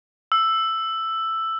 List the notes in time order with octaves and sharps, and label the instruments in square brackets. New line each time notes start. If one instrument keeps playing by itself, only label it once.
[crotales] E6